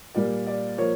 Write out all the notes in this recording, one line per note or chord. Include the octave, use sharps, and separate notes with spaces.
A#2 G3 A#3 D5
D5
F3 A#3 C#5